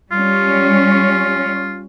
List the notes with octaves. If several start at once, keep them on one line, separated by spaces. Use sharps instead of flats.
G3 C#4 F4